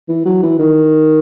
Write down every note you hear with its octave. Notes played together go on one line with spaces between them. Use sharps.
E3
F#3
E3
D#3